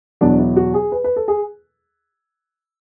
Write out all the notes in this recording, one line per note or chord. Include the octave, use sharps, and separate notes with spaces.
E2 B2 F#3 D4
E4
F#4
G#4
B4
B4
A4
G#4